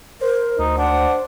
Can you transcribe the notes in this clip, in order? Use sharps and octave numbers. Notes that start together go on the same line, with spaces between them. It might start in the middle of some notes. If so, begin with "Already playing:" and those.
A#4 C5
D2 D#4
D4 F#5